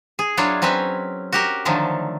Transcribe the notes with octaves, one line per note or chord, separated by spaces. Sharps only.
G#4
F#3 D4 E4 F4 C#5
F#3 C4 C#4 B4 E5
F#4 G4 A#4
D3 D#3 F3 F#3 A3